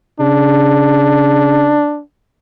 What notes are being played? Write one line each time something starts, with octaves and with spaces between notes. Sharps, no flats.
C#3 D4